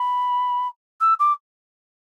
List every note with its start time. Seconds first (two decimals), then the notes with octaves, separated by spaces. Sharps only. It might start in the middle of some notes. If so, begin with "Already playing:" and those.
Already playing: B5
1.01 E6
1.19 D6